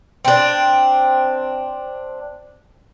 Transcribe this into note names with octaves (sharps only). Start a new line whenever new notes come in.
C4 D4